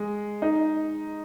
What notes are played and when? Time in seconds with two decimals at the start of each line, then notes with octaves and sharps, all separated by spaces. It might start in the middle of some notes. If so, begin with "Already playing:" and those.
Already playing: G#3
0.42 D#4